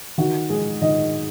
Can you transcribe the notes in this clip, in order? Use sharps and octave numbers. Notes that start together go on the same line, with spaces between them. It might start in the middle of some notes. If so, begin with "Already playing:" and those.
D#3 F#4
G#3 D#4 G#4
D#3 D#5